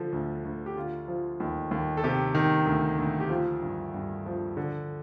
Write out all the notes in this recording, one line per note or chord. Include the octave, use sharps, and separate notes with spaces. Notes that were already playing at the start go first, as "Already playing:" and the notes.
Already playing: D3 F3
D2
D2
G4
D3 F4
F3
D#2
D#2
A4
C3 G4
D#3
D2
D2
G4
F3 F4
G2
G2
F3
D3